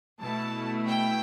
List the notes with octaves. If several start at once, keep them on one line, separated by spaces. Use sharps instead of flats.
B2 A3 E4 A5
G5